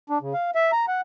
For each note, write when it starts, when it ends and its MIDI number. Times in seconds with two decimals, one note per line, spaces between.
0.10 0.18 62
0.21 0.33 49
0.34 0.51 77
0.55 0.71 76
0.73 0.86 82
0.88 1.01 78